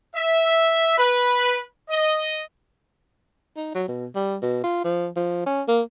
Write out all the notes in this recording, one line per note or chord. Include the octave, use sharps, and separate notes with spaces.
E5
B4
D#5
D#4
F#3
B2
G3
B2
F4
F3
F3
C#4
A#3